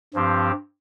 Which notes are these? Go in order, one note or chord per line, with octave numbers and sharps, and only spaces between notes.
G2 F3 C4 G4